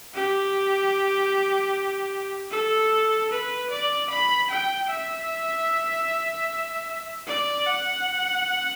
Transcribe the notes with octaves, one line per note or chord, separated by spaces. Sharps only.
G4
A4
B4
D5
B5
G5
E5
D5
F#5